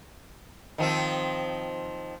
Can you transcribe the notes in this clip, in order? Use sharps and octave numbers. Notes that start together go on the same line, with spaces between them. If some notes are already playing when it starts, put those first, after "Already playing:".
D#3 F3 C4